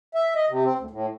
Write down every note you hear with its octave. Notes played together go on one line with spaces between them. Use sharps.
E5
D#5
C3
C4
D2
A2